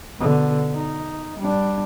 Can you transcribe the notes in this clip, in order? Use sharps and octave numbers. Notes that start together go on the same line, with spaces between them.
B2 D3
D#4
G3 D4